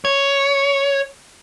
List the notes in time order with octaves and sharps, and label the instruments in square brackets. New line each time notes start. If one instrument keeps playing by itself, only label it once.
[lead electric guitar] C#5